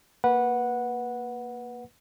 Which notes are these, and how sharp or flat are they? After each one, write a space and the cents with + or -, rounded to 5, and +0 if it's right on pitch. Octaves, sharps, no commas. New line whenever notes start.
A#3 +0 B4 -15 F#5 -10